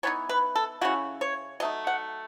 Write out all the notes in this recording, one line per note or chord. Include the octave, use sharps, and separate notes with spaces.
E3 B3 D#4 C#5
B4
A4
C#3 G#3 C#4 E4 F#4
C#5
F#3 A3 D#4 D#5
F#5